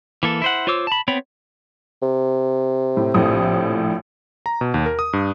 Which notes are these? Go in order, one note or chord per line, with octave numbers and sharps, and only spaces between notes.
E3 A#3 A4
E4 C5 F#5
F4 C5 C#5 D6 E6
A5 B5
B3 C4 C#5 G5 B5
C3
A2
A#1 A2 D#6
A#5
B2
D#2
A#4
D#6
G2